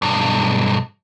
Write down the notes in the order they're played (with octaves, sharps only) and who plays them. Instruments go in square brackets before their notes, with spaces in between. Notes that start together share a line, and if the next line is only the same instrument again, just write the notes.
[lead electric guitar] B1 G2